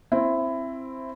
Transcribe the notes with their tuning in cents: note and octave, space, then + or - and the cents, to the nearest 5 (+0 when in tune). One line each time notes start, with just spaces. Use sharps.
C4 +10 E4 +15